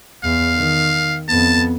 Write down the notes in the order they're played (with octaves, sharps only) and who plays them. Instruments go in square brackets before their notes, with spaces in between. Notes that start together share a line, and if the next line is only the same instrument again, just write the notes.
[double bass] E2 [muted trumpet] F5
[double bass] D#3
[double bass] F2 B3 [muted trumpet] A5